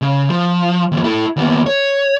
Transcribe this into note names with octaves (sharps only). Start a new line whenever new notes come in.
C#3
F3
D#2 F3
E4 A4
D#2 B3
C#5